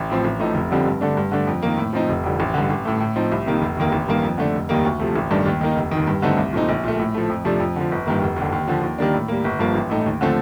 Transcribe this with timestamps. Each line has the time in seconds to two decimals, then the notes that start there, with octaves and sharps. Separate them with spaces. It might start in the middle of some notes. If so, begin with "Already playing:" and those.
Already playing: A1
0.10 A2 F3 C4
0.25 A1
0.40 A2 F3 A3 D#4
0.55 F1
0.71 F2 D3 G3 C4
0.86 G2
1.01 D3 A3 D4
1.17 G2
1.32 D3 A3 D4
1.47 F2
1.63 D#3 A#3
1.77 A2
1.93 F3 C4 D#4
2.09 F1
2.24 F2 D3 G3
2.40 A1
2.54 G2 D3
2.70 A1
2.85 A2 A3
3.00 A2
3.16 F3 C4 D#4
3.32 C2
3.46 C3 D#3 A#3 D#4
3.62 F1
3.77 D#2 D#3 A#3
3.92 A1
4.08 G2 D#3 A#3
4.23 F2
4.38 D3 A3 D4
4.54 F1
4.69 D#2 D#3 G3 A#3
4.85 D2
5.00 C3 F3 A3
5.16 A1
5.31 G2 D#3 A3 D4
5.46 D#2
5.61 D#3 A#3 D#4
5.76 F1
5.91 D#3
5.97 D#2
6.07 G2
6.22 D3 A3 C4 D#4
6.37 C2
6.53 A#2 A3 C4 D#4
6.69 A#1
6.84 A#2 A3
6.99 A2
7.14 F3 A3
7.30 F2
7.45 C3 F3 A3 D4
7.60 F2
7.76 D3 F3
7.92 G1
8.06 G2 D#3 A#3
8.22 F1
8.36 D#2 D3
8.52 D#2
8.68 D3 F3
8.82 D#2
8.98 D#3 G3 A#3 D4
9.14 A2
9.28 G3 A#3
9.44 G1
9.59 G2 F3 A#3
9.75 A1
9.90 A2 A3 D#4
10.06 D#2
10.21 D3 F3 A3 C4